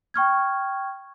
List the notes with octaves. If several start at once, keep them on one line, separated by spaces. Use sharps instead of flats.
G5 C#6 F6 G#6